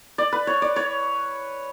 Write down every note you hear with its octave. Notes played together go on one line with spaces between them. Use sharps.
D5
B4
C#5
D5
C#5